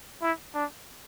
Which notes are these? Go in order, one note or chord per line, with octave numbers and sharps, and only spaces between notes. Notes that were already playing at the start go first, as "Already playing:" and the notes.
E4
D4